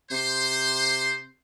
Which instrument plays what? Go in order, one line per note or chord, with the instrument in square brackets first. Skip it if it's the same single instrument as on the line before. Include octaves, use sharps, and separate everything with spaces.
[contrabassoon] C3 [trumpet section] C5 C6